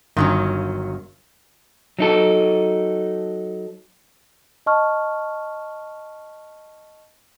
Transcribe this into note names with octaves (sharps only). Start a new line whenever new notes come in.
G1 D#3 F#3 C#4 F4
F#3 D#4 A4
D#5 A5 C#6 F6